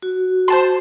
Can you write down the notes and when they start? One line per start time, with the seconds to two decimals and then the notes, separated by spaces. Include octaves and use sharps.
0.02 F#4
0.48 C5 A5 C6